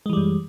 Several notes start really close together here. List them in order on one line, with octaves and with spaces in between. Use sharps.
G#3 E3 G3 F#2